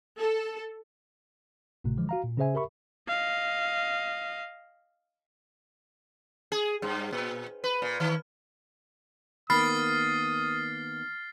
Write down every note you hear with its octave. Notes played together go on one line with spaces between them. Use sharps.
A4
G#1 A2 C3 A3
D3 E3 F3 G#3
F#4 F5 A#5
A#2
C#3 C#4 G#4 C5 E5 G#5
G4 A#4 E5 B5 C#6
D#5 F5
G#4
G2
A#2
B4
A#2
D#3
D#3 A#3 B3 B5 D#6 F6 A6 C7